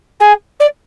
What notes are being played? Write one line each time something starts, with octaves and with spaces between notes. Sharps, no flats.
G#4
D5